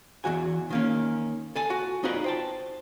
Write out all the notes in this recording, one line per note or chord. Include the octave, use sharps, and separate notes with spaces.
E2 G#2 E3 F#4 G#5
D#3 A#3 C#4
A4 G#5 A5
F#4
D#4 F4 F#4 G#4 B4 D5
C5 G5 A5